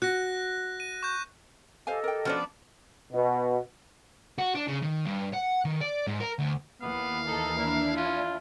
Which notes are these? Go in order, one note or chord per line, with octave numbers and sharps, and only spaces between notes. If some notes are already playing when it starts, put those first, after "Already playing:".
F#4 F#6 A#6
D#7
C#6 G6
G4 A4 C5 D#5 F5 G#5
A#4 G5
F3 B3 C#4 D4 F#4 C5
B2
F#4
D4
C#3
D#3
G2
F#5
D#3
D5
G#2
A#4
D2
D#2 E3 A#3 B3 F5
D#4 A4
D4 E4 A#4
C#4 F4